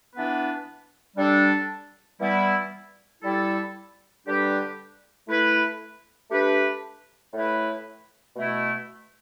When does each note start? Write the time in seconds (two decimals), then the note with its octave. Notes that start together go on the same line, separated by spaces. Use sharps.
0.14 E3 B3 D4 B4
1.17 G3 D4 A4
2.19 E3 G3 B3 E4
3.23 G3 E4 A4
4.25 D3 G3 D4 G4 B4
5.27 A3 E4 B4
6.30 A3 D4 G4 B4
7.33 A2 A3 E4 B4
8.36 B2 A3 E4